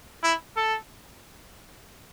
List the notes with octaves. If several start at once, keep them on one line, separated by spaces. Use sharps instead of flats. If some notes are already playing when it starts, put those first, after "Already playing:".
E4
A4